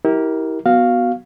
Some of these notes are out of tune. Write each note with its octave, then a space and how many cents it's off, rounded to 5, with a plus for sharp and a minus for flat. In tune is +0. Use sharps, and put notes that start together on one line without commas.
E4 -35 G4 -25 A#4 +0
B3 +0 F#4 +0 F5 +0